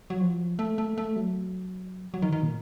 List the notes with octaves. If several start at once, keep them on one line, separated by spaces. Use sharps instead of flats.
F#3
F3
A3
A3
A3
F#3
F#3
D#3
D#3
A#2